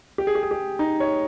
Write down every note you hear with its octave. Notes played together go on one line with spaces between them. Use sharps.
G4
G#4
G4
G#4
G4
D#4
C#5